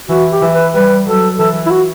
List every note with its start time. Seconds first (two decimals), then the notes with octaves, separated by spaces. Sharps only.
0.09 E3 F#4
0.31 G4
0.42 E3
0.52 B4
0.74 G3 B4
1.06 F#3 A4
1.38 E3 A4
1.66 E4
1.71 F#4